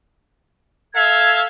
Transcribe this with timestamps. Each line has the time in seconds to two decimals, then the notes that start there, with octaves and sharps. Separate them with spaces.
0.95 A4 E5 F5 G#6